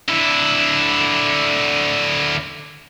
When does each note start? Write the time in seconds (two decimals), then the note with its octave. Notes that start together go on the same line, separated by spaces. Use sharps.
0.09 D3 E4